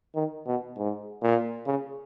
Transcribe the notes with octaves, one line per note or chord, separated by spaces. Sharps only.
D#3
B2
G#2
A#2
C#3